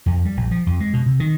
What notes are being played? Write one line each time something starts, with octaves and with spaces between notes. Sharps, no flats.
F2
G3
A#1
F3
F2
G#3
B2
C3
D#3